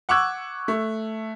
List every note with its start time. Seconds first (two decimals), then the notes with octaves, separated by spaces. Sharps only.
0.09 F#5 C#6 D6 E6 F#6 G#6
0.68 A3